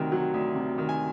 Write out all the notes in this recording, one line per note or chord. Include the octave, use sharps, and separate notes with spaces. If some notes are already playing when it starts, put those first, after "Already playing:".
Already playing: D2 C3 D#3 F#3 G5
F#3
D2
C3
D#3
G#5